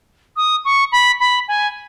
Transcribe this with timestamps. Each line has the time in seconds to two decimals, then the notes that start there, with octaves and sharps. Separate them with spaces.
0.37 D#6
0.65 C#6
0.92 B5
1.20 B5
1.48 G#5